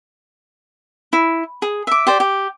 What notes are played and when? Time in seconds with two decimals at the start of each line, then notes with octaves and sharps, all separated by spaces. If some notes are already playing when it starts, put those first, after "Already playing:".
1.13 E4
1.62 G#4
1.87 E5 D6
2.07 G4 C5 D5
2.20 G4